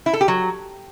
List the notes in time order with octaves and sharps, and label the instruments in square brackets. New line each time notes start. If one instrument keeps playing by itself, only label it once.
[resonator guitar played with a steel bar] E4
A4
G4
F#3